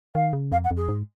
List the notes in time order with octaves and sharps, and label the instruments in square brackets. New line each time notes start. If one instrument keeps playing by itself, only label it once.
[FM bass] D#3 [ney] F5
[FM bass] C#3
[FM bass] F2 [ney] F5
[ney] F#5
[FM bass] F2
[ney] G#4
[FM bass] G#2